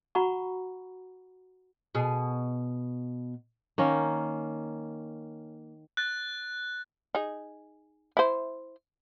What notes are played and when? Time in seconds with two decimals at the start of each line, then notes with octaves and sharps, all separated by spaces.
0.15 F#4 F#5 A#5 B5 C#6
1.95 B2 G#4
3.78 D#3 A#3 C#4
5.97 F#6 A6
7.15 D#4 G#4
8.17 E4 C5